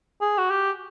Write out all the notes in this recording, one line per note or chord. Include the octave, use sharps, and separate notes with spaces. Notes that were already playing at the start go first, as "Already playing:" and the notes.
G#4
F#4
G4